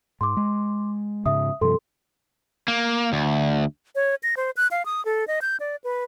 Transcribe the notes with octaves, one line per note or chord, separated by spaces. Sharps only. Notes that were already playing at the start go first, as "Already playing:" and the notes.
G#2 C6 D6
G#3
G#2 C#3 E5 D#6
G2 C3 F3 A4 C6
A#3
D2
C#5
A#6
C5
F#6
F5
D#6
A4
D#5
G6
D5
B4